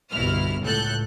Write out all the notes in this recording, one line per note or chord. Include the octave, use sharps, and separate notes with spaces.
G1 C2 B2 E4 F6
C#2 A2 A4 F#6 G6